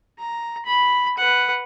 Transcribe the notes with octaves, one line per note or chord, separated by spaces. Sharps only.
A#5
B5
B4 F#5